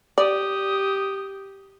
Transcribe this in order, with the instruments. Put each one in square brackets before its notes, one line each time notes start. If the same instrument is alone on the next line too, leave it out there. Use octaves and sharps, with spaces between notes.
[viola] G4 [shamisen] D5 [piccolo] D#6